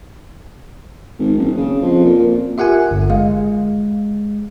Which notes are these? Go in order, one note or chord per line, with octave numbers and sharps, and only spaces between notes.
G#1
F#1
C#3
F2
A#2
F4 G4 A#4 E5 F#5 G#5
G1
G#3 F5